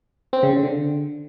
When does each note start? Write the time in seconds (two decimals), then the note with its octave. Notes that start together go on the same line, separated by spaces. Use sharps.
0.33 C4
0.43 C#3
0.53 C#3
0.63 D3